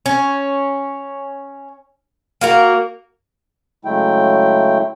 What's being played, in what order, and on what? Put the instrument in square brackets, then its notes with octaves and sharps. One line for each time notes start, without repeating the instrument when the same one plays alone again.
[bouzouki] C#4
A#3 F#4 A#4
[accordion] C#3 F#3 G#3 A3 E4 G5